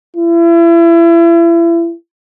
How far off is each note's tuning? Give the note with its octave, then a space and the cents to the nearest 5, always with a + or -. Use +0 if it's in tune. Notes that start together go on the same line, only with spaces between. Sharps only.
E4 +35